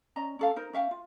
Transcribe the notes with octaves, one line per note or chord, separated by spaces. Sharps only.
C#4 D5 D#5 A#5
C#4 A4 F5
D#4 A#4 C5
C#4 E5 F5 G5
F4